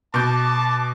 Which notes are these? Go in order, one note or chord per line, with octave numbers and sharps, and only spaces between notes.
B2 A5 D6 G6